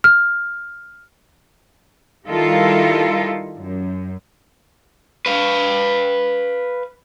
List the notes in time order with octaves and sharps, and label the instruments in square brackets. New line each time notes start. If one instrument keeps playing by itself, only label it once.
[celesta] F6
[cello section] D#3 G3 E4 F4 A4 A#4
F#2
[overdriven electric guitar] B4 F5